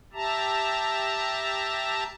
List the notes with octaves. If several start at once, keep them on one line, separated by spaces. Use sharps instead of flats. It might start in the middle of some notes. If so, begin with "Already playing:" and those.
G4 E5 A5 A#5